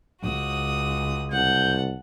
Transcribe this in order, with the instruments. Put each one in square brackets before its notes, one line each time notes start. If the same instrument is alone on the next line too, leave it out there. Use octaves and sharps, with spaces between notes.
[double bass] C#2 [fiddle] F#4 D#6
[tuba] C2 [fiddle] F#5 A5 [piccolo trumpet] G6